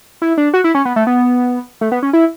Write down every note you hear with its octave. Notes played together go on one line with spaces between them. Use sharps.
E4
D4
F#4
E4
C#4
B3
A3
B3
A3
B3
C#4
E4